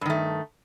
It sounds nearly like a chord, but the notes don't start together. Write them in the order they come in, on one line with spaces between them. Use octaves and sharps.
G2 D#3 A3